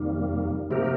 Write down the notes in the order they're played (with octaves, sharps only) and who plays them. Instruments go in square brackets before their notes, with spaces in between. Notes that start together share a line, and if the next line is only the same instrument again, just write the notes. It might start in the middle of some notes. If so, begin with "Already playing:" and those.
Already playing: [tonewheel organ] F2 C3 G3 A#3 [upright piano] D#3
[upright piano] C3 [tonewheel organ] F3 A#3 D#4 G4 A#4